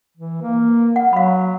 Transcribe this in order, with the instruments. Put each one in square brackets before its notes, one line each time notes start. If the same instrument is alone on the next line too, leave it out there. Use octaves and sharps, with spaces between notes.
[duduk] E3
A#3
[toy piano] F#5
[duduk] F#3 [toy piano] F5 B5